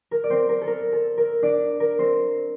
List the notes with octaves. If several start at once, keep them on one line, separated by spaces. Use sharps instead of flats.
A#4
D5
C4 C5
A#4
A4
A#4
A4
A#4
D4 D5
A#4
C4 C5